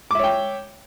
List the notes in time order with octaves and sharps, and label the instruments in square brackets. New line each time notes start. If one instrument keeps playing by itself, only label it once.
[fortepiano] D6
E5
C#5
G5